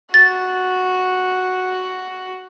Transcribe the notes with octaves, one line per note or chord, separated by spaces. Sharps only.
F#4 A6